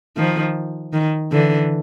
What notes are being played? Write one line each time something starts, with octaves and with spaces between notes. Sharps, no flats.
D#3 F3
D#3
D3 E3